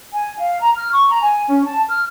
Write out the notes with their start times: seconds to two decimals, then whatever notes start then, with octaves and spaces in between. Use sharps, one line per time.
0.13 G#5
0.39 F5
0.61 A#5
0.76 F6
0.91 C#6
1.10 A#5
1.22 G#5
1.48 C#4
1.64 A5
1.88 F6